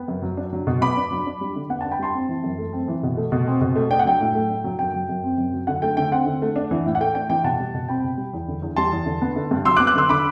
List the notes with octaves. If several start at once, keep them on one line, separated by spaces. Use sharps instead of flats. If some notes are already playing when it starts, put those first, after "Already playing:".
Already playing: B3 G5
F#2
F#3
D4
F#3
B2
B3 B5 D6
D4
F#3
D4
G3
D3
B3 F#5
D4 F#5 A5
G5 B5
G3 A5 C6
C4
E3
F#2
A3
C4
E3
B2
A3
B2
C4
B2
A3
D4 G5
F#5
F#3 G5
A2
A3
D4
F#3
F#2 G5
F#3
F#2
C4
F#2
F#3
D3 F#5
A3 G5
D3 G5
C4 F#5
D3
A3
D4
E3
A2
F#5
A3 G5
D4 G5
E3 G5
B2 F#5 A5
G3
B2
C4 G5 B5
B2
G3
E2
D3
E2
G3 A5 C6
E2
D3
B3
D3
G2
F#3 C6 E6
D6 F#6
B3
D6 F#6
D3 C6 E6
D3 B5 D6